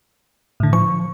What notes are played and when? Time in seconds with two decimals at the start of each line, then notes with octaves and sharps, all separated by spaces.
0.60 A2 D3
0.73 F3 C#6